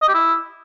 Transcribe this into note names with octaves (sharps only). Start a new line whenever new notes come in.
D#5
G4
E4